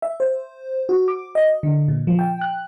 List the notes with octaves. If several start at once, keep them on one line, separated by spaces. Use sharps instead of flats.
E5
C5
F#4
D6
D#5
D3
A#2
F3
G5
F#6